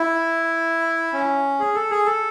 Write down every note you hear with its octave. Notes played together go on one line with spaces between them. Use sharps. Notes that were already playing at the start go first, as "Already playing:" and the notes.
Already playing: E4
C#4
G#4
A4
G#4
A4